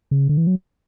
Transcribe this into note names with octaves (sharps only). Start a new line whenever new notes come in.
C#3
D3
E3
F#3